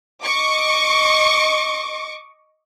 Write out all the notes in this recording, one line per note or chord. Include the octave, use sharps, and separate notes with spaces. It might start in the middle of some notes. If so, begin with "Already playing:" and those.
D#5 C#6 D6